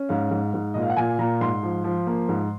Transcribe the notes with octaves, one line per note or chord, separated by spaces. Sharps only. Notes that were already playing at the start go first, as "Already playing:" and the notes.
Already playing: C#4
G#2 F5
G#2
G#2
A#2 D#5
F5
F#5
A#2 G#5
A#2 A#5
G#2 C6
F3
F3
A#3
G#2